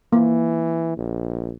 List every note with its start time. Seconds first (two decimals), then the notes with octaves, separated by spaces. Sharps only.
0.13 E3 A#3
0.97 A#1